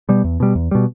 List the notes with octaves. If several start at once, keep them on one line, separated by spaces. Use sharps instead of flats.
B2 G3
E2
B2 G3
E2
B2 G3